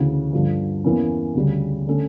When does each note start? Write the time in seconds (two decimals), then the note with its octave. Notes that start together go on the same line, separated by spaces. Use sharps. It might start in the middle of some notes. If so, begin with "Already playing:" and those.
Already playing: D2 C#3 E3
0.33 G2 D3 F3
0.84 E2 E3 A#3 C#4
1.35 D2 C#3 G3
1.87 D3 A3 C#4